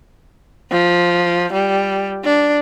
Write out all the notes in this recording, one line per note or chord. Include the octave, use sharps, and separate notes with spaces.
F3
G3
D4